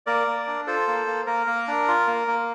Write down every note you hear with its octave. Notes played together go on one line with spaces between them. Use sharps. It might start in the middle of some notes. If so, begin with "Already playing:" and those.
A#3 A#4 D5
A#3
D4
F4 A4 C5
A#3
A#3
A#3 A#4
A#3
D4
F4
A#3
A#3